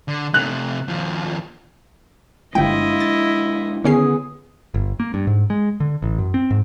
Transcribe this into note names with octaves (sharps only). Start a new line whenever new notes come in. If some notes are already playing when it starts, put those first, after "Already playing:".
D3
C3 A3 F#6 F7
D#2 F3
G1 G#3 A#3 D4 E4 F4 D#5 G5
A6
D3 D#3 B3 C#4 G#4 C7
G1
A#3
G2
G#2
G#3
D3
A1
F#2
C4
G#2